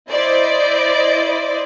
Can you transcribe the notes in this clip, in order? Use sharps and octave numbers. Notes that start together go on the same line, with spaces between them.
E4 C5 D5 D#5